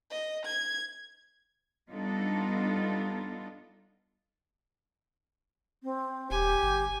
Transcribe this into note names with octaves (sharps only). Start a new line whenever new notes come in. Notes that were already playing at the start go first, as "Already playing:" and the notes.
D#5
G#6
G3 B3 D4 D#4 F4 A4
C4
D#1 G4 G#5
G1